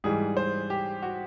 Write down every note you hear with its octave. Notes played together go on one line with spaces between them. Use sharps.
G#2 E3 G3 G#4
C5
G4
F#4